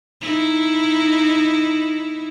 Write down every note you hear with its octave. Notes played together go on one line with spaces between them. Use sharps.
D#4 E4